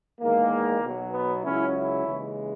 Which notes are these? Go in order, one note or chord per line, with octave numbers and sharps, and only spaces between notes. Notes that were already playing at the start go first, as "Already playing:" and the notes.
E2 D#3 G#3 A#3
B1 B2 F#3
B3
C#2 C#3 F#3 C#4 E4
C#4 E4
D#2 C#3 E3 G#3